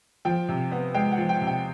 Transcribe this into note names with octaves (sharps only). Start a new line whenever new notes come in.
F3 G5
C3
B3
G#3 G5
F#5
F3
G5
C3
G5